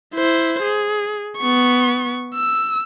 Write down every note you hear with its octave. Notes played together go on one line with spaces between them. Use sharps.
E4 C5
G#4
B3 C#6
E6